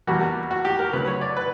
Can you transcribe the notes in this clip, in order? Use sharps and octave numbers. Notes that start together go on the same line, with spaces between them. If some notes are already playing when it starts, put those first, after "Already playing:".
E2 B2 G3 A#3 F#4
F#4
G4
A#4
D2 C#3 F#3 B4
C#5
D5
B4